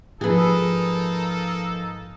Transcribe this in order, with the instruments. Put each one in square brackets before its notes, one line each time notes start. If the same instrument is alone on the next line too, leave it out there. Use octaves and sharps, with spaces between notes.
[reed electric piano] G#2 F3 [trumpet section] A#3 D#4 A4 [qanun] G#4 B4